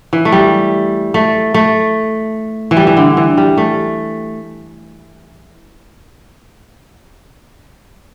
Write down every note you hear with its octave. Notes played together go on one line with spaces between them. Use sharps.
E3
A3
G3
A3
A3
E3
G3
E3
D3
E3
G3
A3